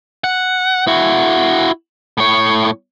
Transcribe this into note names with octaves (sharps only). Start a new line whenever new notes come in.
F#5
E4 F#4
A2 C#5